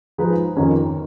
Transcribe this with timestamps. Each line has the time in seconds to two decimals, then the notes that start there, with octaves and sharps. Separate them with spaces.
0.18 F3 G#3 D#4 G#4 B4
0.57 F2 D#3 A#3 C#4